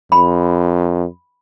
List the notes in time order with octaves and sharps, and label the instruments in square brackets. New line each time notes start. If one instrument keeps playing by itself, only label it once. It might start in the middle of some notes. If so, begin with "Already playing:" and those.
[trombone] F2 [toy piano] B5